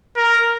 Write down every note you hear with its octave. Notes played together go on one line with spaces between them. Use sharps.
A#4